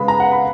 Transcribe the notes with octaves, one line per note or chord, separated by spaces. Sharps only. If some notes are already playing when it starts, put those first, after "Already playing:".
Already playing: C#3 G#3 B3 B5
A#5
F#5
B5